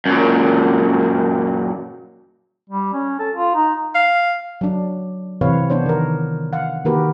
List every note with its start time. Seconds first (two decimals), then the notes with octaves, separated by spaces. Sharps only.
0.06 F#2 A#2
2.70 G3
2.93 C#4
3.19 A4
3.35 F4
3.55 D#4
3.95 F5
4.61 F#3 D4
5.41 C3 E3 C4 B4 C#5 F5
5.70 B3 D4 C5 C#5
5.86 D#3 A#4
6.53 F5 F#5
6.85 D#3 A#3 F#4 G4 A#4 B4